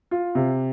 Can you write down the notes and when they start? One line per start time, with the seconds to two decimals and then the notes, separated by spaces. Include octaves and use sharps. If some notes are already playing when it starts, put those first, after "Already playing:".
0.11 F4
0.35 C3